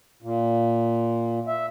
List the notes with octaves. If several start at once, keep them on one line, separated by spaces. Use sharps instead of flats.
A#2
E5